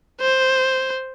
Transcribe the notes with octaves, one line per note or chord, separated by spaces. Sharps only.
C5